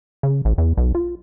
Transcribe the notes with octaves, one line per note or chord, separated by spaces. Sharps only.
C#3
A1
E2
B1
F4